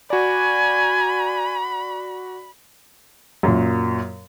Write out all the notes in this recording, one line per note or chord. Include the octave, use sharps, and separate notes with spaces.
F#4 D5 G#5 B5
F#2 A#2